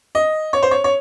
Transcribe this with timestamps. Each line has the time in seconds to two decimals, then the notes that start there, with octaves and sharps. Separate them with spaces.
0.15 D#5
0.53 C#5
0.62 C5
0.71 C#5
0.84 C#5